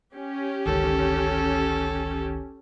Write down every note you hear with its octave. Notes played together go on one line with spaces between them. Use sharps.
C#4 G4
G1 C#2 D#3 A4